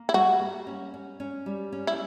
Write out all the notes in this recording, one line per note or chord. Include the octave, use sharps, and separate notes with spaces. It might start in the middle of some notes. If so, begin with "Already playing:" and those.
Already playing: A#3
E4
G3 F#4
A#3
C#4
C#4
C#4
G3
C#4
E4